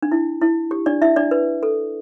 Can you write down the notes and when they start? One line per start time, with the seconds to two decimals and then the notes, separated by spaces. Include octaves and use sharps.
0.02 D4
0.12 E4
0.41 E4
0.71 G4
0.86 D4 D5
1.02 E4 E5
1.16 D4 D5
1.31 B4
1.63 A4